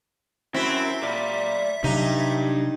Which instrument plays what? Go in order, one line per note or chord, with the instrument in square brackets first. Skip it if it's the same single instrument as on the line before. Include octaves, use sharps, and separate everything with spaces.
[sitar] C4 E4 [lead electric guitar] C#4 F#4 [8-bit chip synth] E5 B6
[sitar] A#2 [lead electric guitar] D5 B5
[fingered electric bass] C3 F#3 [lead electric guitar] D4 G4 [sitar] D#4